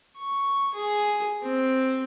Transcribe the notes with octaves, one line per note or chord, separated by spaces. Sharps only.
C#6
G#4
C4